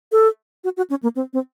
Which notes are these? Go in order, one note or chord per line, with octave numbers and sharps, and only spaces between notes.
A4
F#4
F#4
C#4
A#3
C4
C4